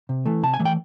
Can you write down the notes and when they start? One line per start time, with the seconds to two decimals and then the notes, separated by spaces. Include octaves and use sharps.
0.09 C3
0.26 E3 A3
0.43 C3 A5
0.54 G#5
0.59 E3 A3
0.65 G5